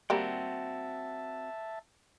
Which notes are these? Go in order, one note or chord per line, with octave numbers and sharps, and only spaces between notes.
G3 A#3 C4 F#4 E5 G5 A5